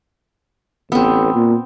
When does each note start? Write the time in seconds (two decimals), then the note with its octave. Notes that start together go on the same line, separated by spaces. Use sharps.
0.92 A1 B3 C4
1.35 A#2